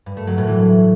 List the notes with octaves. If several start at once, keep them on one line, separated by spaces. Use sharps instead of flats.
G2
A3
F#3
A2
E3